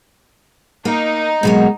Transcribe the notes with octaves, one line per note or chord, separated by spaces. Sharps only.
A#3 D#4
B2 F#3 G#3 A#3